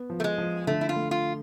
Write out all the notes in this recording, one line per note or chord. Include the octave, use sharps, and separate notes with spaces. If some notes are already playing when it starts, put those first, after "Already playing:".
Already playing: B3
F3
A3
G#3
F3
D3 A3
E4
F4
A3
F4